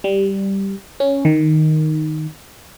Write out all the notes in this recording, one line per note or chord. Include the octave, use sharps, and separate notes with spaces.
G3
C#4
D#3